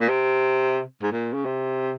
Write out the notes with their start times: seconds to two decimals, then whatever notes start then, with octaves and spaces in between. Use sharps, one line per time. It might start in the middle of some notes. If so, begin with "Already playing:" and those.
0.01 A#2
0.09 C3
1.02 G#2
1.12 A#2
1.34 C#3
1.45 C3